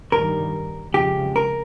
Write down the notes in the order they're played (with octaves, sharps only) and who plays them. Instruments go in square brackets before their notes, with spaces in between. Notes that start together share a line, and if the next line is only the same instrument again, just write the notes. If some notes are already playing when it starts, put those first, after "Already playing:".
[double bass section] G2 D#3 G3 [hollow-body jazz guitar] A#4
[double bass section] F2 C#3 F3 G#3 [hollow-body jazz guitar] G4
[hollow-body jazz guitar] A#4